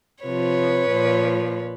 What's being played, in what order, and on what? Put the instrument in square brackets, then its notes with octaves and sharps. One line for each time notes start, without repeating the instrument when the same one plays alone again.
[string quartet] C3 F3 B4 C#5
A#2 F3